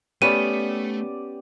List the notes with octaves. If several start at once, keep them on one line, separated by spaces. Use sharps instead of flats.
A3 B3 C#4 G4 D5 D#7